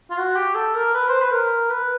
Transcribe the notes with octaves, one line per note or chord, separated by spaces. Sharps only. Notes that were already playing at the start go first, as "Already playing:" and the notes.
F4
F#4
G4
A4
A#4
B4
C5
B4
A#4
B4